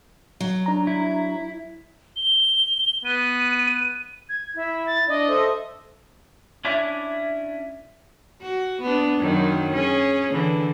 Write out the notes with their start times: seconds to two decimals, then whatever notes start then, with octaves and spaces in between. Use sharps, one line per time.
0.40 F#3
0.66 D4 A#5
0.87 E4
2.16 G7
3.05 B3 D#7
4.29 G#6
4.56 E4 E5
4.87 A6
5.09 D4 D5 D#5
5.29 A4 C5 E5
6.65 C#4 D4 E4
8.42 F#4
8.81 B3 D4
9.19 F#2 D#3 F#3
9.73 C#4 G#4
10.31 D3 E3